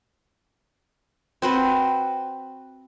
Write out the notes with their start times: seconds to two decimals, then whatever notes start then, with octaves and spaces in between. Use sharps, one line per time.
1.42 C4 F#4 B4